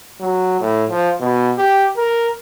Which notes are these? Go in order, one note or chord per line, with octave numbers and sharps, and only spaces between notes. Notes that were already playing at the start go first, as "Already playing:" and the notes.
F#3
A2
F3
B2
G4
A#4